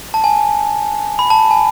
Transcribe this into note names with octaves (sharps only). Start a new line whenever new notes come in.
A5
G#5
B5
A5
G#5